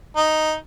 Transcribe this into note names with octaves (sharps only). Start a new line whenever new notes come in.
D#4